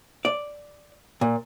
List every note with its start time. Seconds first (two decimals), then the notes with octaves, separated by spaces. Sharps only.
0.25 D5
1.21 A#2